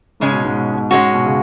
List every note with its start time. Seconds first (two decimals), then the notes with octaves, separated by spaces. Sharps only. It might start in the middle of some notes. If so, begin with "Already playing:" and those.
0.20 G#2 C#3 G#3 C#4
0.32 B2
0.44 G#2
0.56 B2
0.73 B2
0.91 G#2 G#3 C#4 F#4
1.14 B2
1.26 C#3